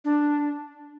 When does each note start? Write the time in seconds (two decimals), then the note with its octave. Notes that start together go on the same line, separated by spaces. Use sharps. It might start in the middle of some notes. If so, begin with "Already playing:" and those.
0.05 D4